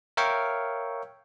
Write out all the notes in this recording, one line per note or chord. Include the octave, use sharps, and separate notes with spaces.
A#4 C#5 E5 F5 G5 C#6